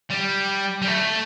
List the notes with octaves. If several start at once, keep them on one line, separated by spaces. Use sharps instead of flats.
G3
G3
A3